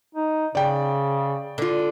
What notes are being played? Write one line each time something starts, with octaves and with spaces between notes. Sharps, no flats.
D#4
C#3 D5 G5
D3 F4